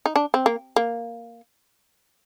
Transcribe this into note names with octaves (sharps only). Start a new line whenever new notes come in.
D#4
D4
C4
A#3
A#3